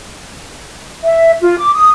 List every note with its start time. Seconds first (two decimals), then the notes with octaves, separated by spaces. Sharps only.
1.03 E5
1.40 F4
1.58 D6
1.73 D#6